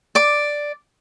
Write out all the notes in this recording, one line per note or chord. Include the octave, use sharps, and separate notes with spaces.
D5 D6